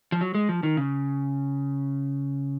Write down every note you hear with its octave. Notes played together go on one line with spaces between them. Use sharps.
F3
F#3
G#3
F3
D#3
C#3